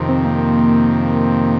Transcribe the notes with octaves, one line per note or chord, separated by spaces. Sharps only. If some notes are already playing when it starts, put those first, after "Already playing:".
Already playing: F2 C3 D#3
C4
A#3